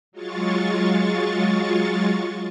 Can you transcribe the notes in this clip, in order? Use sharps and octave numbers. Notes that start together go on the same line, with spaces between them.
F#3 G#3 F4 C#6 A6